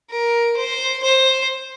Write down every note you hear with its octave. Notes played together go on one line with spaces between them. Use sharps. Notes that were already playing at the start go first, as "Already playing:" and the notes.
A#4
C5
C5